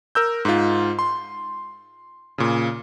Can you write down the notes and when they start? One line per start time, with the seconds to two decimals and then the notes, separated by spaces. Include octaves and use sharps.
0.15 A#4 E6 G6
0.45 G#2 F4
0.99 C6
2.38 A#2 C#3